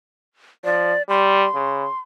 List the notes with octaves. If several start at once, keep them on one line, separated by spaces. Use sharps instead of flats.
F3 D5
G3 C6
C#3